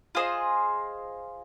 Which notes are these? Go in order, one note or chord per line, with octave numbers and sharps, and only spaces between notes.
F4 G#4 C5 D#5